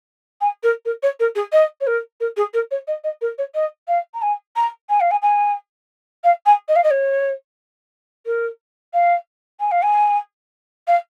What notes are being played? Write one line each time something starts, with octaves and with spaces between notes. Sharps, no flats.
G#5
A#4
A#4
C#5
A#4
G#4
D#5
C#5
A#4
A#4
G#4
A#4
C#5
D#5
D#5
A#4
C#5
D#5
F5
A#5
G#5
A#5
G#5
F5
G#5
G#5
F5
G#5
D#5
F5
D#5
C#5
A#4
F5
G#5
F5
G#5
F5